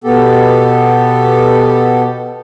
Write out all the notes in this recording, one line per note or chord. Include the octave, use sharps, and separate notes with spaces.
B2 B3 G4 A4